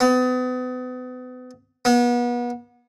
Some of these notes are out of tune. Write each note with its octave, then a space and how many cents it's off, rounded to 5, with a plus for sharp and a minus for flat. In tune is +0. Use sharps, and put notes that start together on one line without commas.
B3 +35
B3 -35